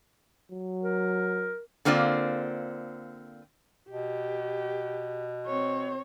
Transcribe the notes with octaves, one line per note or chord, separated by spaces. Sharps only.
F#3
A#4
D3 A#3 C4 F4 D5
B2 G4
C4 C#5